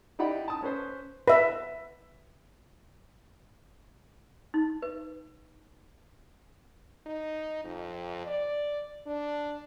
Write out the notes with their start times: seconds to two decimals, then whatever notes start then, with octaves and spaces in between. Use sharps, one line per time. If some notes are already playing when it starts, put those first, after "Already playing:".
0.19 D#4 E4 G4 D5 F#5 B5
0.48 A5 D#6
0.62 C#4 B4 C5
1.28 B4 E5
4.54 D#4
4.82 B4
7.07 D#4
7.64 F2
8.27 D5
9.06 D4